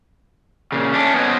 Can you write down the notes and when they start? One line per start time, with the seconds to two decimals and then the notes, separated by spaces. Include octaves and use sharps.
0.72 A#2 C#3
0.94 A3 C#4 D4
1.14 B3 C#4 F#4 C5 D#5